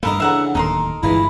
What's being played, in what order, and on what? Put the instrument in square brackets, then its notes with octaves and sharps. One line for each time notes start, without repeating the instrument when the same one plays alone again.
[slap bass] G2 A3 [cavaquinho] E4 A#4 D#5 [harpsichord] F5 A5 A#5
[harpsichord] D2 C#3 [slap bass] E3 [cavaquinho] E5 F#5 A#5
[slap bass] D1 D#2 [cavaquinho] D#4 A#4 C6 [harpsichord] A4
[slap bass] G1 G2 [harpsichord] E3 G#3 F4 [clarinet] E4